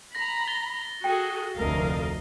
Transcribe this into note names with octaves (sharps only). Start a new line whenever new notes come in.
A#5 B5 A#6
A6 G7
F#4 G#4 A4 G5
F1 D2 A3 A#4 D#5 F5